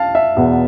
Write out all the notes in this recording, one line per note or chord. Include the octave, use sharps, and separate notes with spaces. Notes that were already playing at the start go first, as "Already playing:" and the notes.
Already playing: F5 A5
E5
E2 B2 B3